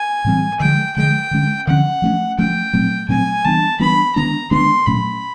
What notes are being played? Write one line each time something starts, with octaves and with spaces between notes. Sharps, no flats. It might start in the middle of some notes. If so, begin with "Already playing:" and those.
Already playing: G#5
A2 E3 G3 C4
D3 F3 G#3 G5
D3 F3 G#3 G5
D3 F3 G#3 C#4
D3 F3 G#3 C#4 F#5
F3 A3 C#4
F3 A3 C#4 G5
A#2 F#3 A3 C4
A#2 F#3 A3 C4 G#5
E3 G3 B3 D4 A5
E3 G3 B3 D4 B5
D#3 G#3 B3 D4 A#5
D#3 G#3 B3 D4 C6
A#2 F#3 A3 C#4 B5